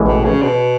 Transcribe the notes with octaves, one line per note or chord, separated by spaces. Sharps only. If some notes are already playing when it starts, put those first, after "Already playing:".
Already playing: A1 A2 E3 G#3
B2
C#3
B2